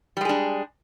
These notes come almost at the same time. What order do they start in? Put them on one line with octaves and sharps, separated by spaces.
G3 G#3 G#4 D4